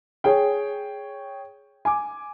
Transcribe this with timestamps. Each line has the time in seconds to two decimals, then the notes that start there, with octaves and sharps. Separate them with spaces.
0.24 G#4 C#5 G5
1.85 G#5 D6